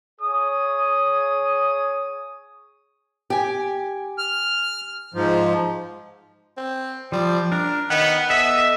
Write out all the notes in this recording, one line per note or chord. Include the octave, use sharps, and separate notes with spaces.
G#4 C#5 D#6
G4 G#5
F6
G#2 F3
C4
F3 G3
D4 A#4
D#3 B3 F#5
B3 A4 D#5 E5